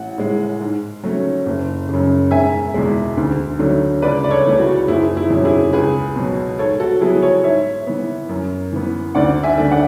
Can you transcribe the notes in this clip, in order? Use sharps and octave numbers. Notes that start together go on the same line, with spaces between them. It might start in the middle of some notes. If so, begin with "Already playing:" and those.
Already playing: A1 F#5
A2 G#3
G#2
F#3 A3 C#4
F#1
F#2 C#3
E1 E5 G#5
E2 B2 G#3
D2
D3 F#3 A3
C#2 B4 D5
D5
A4 C#5
C#3 E3 A3 C#4
F#4
F#1 E4 G#4
E4 G#4
E2 B2 F#3 C#4
E4 G#4
C#2 G#4 B4
B2 F#3
G#2 A4 C#5
F#4 A4
F#3 B3 E4 G#4
A4 C#5
G#2 C#5 E5
E3 B3
F#2
E3 B3
D2 D5 F#5
E5 G#5
D3 A3 D4
D5 F#5